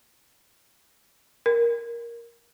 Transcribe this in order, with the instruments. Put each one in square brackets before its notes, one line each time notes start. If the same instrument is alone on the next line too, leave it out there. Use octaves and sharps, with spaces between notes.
[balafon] A#4